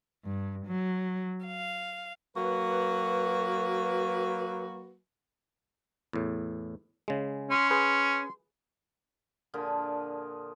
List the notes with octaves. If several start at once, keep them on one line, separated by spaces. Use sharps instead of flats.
G2
F#3
F5
F#3 A#3 F#4 B4
E2 A2
C#3 G#3
C#4 C6
G#4 B4 C6
A#2 D3 F3 G#4